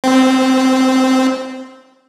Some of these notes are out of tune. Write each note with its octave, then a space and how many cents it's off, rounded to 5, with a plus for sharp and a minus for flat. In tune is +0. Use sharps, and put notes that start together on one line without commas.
C4 -5